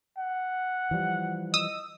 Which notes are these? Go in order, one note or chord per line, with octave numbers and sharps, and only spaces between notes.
F#5
E3 F3 G3
D#5 D#6 E6